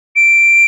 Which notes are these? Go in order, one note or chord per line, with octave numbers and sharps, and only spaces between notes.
D7